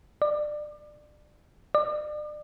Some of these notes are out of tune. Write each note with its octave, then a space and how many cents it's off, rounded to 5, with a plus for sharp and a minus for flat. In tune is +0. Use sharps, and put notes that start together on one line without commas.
D5 +25
D5 +35